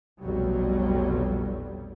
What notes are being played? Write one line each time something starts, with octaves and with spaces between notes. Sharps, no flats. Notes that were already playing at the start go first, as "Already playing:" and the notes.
F1 B1 F2 F#3 G3